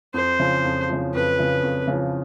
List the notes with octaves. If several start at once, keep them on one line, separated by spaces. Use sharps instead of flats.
F2 C5
C#3 F3
F2
C#3 F3
F2 B4
C#3 F3
F2
C#3 F3